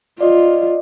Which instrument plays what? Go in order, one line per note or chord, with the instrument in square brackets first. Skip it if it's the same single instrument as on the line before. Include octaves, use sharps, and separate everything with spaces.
[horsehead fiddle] F4 [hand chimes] D5 D#5